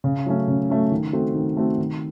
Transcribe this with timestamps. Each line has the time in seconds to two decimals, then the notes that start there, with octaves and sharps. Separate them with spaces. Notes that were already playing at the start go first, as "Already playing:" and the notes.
0.04 C#3
0.26 F#3 A3 C#4
0.48 C#3
0.70 F#3 A3 C#4
0.92 D#3
1.13 A3 C4 F#4 A4
1.35 D#3
1.57 A3 C4 F#4 A4
1.78 D#3